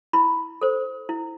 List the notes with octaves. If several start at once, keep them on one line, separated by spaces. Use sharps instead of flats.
E4 B5
A4 C5
E4